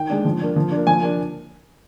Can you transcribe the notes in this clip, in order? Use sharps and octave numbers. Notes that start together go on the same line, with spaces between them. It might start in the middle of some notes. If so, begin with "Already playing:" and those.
Already playing: D#3 G5
G#3 D4
F3
A#3 D4
F3
A#3 D4
F3 G#5
A#3 D4